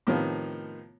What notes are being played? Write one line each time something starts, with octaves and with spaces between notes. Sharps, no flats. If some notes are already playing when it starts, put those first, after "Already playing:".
A2 C3 D#3 F3 B3